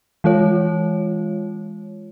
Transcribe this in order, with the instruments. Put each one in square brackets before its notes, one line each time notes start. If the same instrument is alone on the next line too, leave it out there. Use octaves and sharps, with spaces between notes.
[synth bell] E3 G#3 F4 C#5